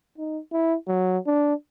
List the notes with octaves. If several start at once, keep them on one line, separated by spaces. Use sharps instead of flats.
D#4
E4
F#3
D4